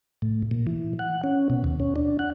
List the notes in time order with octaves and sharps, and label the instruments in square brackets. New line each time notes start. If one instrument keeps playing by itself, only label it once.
[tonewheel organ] A2
A#2
E3
F#5
C#4
B2
D#2
C#4
D4
F#5